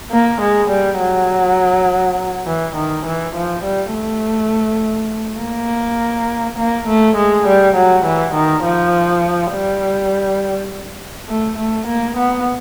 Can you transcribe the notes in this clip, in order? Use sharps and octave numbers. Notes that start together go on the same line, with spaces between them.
A#3
G#3
G3
F#3
E3
D#3
E3
F3
G3
A3
A#3
A#3
A3
G#3
G3
F#3
E3
D#3
F3
G3
A3
A3
A#3
B3